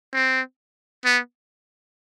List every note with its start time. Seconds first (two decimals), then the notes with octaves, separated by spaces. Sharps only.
0.14 C4
1.05 B3